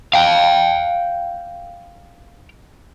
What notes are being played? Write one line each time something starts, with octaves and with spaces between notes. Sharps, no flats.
F5 G5